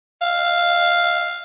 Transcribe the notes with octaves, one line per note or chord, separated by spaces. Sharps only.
F5